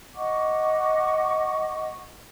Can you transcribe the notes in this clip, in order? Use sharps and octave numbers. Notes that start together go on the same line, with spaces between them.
D#5 F#5 C#6 D6